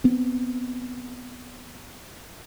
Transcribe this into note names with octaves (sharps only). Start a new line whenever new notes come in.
B3 C4